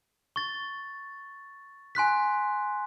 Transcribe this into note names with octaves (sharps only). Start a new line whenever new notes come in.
C#6 A6
G#5 C6 F#6 B6